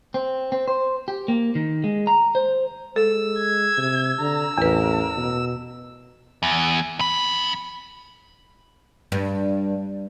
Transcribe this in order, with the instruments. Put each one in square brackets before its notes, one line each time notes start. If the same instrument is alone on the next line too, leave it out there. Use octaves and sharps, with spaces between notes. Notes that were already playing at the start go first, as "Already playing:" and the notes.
[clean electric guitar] C4
C4
C5
G4
A#3
D#3
G#3
A#5
C5
[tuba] G#3 [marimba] A4 [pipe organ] E6
[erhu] G#6
[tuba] C3
[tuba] D3 [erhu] A#5
[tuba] A1 [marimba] E2 B4 [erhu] A#4
[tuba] B2
[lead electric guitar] E2
F2 B5
[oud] G2